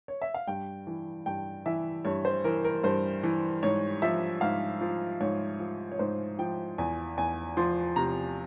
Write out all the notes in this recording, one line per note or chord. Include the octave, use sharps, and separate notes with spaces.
C#5
E5
F5
G2 G5
E3
G2 G5
E3 E5
G2 C#5
C5
E3 A#4
A#4
G2 C5
E3
G#2 C#5
F3 E5
G#2 F5
F3
G#2 C#5
F3
C#5
G#2 C5
F3 G5
E2 G#5
E2 G#5
F3 C6
C3 A#5